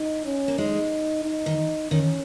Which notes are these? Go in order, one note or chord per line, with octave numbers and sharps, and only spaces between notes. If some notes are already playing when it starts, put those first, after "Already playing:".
Already playing: D#4
C#4
A#3
G#3 D#4
D#4
D#3
D#3 C#4